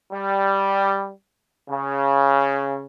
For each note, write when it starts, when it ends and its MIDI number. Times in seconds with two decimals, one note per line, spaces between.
0.12 1.08 55
1.68 2.85 49